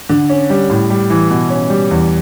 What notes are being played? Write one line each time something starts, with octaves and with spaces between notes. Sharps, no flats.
D3
C#4
G3
A2
G3
E3
B2
C#4
G3
E2